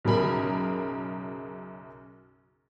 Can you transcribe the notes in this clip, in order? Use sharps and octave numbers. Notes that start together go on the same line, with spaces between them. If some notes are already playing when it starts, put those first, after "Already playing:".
B1 F#2 C#3 A#4 B5